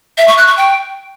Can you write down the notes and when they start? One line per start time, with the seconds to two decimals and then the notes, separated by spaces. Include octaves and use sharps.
0.18 E5
0.28 C#6
0.38 F#6
0.47 C#6
0.57 G5